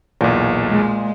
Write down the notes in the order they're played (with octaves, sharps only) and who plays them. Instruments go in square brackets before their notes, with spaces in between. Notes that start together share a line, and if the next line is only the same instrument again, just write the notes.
[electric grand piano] B1 E2 [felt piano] A#2
[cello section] G#3